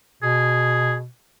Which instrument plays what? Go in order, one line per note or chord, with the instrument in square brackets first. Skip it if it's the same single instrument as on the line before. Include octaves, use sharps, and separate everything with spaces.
[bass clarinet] B2 [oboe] G#4